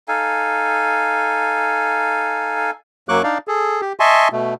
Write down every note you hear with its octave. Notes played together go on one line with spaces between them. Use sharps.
D#4 A4 F5 G#5
F#2 F#3 A#3 C#6 D6 F#6
D4 D#4 D5 F5
G#4 A4
G4
D#5 E5 G#5 A5 C6 C#6
B2 A3